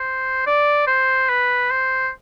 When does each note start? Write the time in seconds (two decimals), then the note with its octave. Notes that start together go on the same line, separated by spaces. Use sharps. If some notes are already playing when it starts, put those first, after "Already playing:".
Already playing: C5
0.46 D5
0.87 C5
1.29 B4
1.71 C5